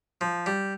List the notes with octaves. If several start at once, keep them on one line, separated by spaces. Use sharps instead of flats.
F3
G3